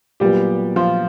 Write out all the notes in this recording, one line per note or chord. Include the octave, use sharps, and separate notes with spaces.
A#2 F#3 G3 B3 G4
F3 F4